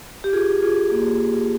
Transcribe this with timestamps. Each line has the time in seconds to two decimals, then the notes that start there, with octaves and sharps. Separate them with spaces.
0.24 G4
0.33 F4 G#4
0.62 F4 G#4
0.91 A#3